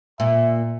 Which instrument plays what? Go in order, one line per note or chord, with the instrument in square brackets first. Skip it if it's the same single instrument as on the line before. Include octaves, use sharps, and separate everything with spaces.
[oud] A#2 [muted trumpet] E5